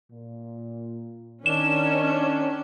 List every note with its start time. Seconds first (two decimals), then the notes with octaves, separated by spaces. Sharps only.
0.10 A#2
1.46 D#3 C#4 D4 E7